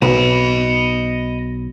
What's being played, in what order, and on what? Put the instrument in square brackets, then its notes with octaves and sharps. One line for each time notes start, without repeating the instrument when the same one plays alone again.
[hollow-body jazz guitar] B1 [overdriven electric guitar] D#5 B5